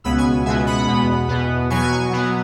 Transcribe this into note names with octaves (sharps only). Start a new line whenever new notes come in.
C#2 B2 G#3 B3 B5 E6
G#5 C#6
C#2 B2 G#3 B3 E5 G#5
F#5 B5
E2 B2 B3
E2 B2 B3
B2 F#3 B3 G#5 C#6
B2 F#3 B3